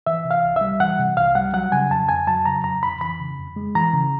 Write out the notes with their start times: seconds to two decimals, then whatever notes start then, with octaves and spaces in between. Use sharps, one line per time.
0.07 E3 E5
0.24 C3
0.31 F5
0.44 C2
0.56 G3 E5
0.80 E3 F#5
0.98 C3
1.17 C2 F5
1.35 G3 F#5
1.53 F#3 F#5
1.72 C#3 G#5
1.90 F2 A5
2.09 F2 G#5
2.27 F#3 A5
2.45 C#3 A#5
2.64 F2 A#5
2.83 F2 B5
3.01 E3 B5
3.20 C#3
3.39 F2
3.56 G#3
3.75 E3 A#5
3.94 C#3